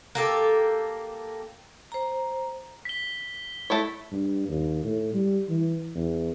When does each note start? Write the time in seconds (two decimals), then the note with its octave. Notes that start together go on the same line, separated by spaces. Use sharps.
0.15 A#3 G4 A4
1.92 C5 A#5
2.85 B6 G7
3.70 A3 E4 C#5
4.12 G2
4.49 D#2
4.84 A2
5.14 G3
5.49 E3
5.95 E2